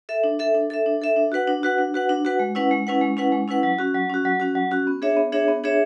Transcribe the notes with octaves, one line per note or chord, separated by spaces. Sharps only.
A4 E5
D4
A4 E5
D4
A4 E5
D4
A4 E5
D4
F#4 B4 F#5
D4
F#4 B4 F#5
D4
F#4 B4 F#5
D4
F#4 B4 F#5
G#3
C#4 E4 B4 F#5
G#3
C#4 E4 B4 F#5
G#3
C#4 E4 B4 F#5
G#3
C#4 E4 B4 F#5
F#3
C#4 F#4
F#3
C#4 F#4
F#3
C#4 F#4
F#3
C#4 F#4
B3
D4 G#4 C#5 E5
B3
D4 G#4 C#5 E5
B3
D4 G#4 C#5 E5